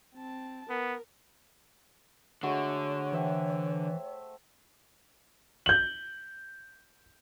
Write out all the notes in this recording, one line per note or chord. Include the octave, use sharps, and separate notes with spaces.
C4 A5
B3 A#4
D3 G#3 A3 F#4 C#5
E3 C5 E5 G5
G6 F#7